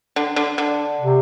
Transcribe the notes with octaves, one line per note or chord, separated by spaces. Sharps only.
D3
D3
D3
C3